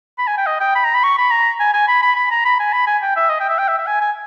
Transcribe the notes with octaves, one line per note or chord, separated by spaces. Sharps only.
B5
G#5
G5
D#5
G5
B5
A#5
B5
C#6
B5
A#5
G#5
G#5
B5
B5
B5
A#5
B5
G#5
B5
G#5
G5
E5
D#5
G5
E5
G5
E5
E5
G#5
G#5